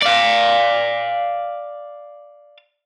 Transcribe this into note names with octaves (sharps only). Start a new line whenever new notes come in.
D5 F5